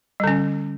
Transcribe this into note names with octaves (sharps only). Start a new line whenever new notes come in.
D3 G3 C#4